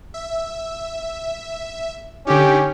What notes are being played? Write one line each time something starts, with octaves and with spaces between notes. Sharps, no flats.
E5
D3 C#4 D#4 G4